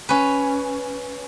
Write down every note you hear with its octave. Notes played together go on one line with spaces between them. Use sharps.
C#4 B4